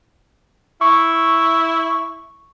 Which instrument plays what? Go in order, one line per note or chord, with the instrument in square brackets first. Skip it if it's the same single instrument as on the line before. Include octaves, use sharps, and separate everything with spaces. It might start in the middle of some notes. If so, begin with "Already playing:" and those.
[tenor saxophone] E4 [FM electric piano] C#6